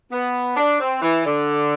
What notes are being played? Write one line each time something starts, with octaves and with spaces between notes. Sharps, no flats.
B3
D4
C4
E3
D3